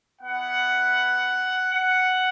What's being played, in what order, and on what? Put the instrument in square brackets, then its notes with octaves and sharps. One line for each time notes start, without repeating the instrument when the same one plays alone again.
[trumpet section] B3 E4 F#5
F#5